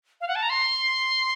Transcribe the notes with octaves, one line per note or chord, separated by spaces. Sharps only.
F5
F#5
A5
A#5
C6